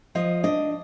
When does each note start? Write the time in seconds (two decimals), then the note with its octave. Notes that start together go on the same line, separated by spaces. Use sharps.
0.15 F3 D#5
0.43 D4 D#5